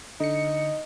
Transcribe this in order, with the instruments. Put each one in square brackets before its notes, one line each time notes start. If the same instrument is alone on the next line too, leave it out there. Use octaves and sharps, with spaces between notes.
[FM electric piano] D3 C#7 [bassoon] D#4